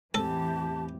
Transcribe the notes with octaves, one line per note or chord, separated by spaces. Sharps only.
E2 A2 E3 C4 G4 A4 A5